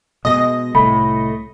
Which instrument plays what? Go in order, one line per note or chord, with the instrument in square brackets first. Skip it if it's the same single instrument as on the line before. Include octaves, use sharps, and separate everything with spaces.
[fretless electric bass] B2 G#3 [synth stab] D#5 A#6
[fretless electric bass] C2 A2 [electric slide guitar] A3 [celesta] B5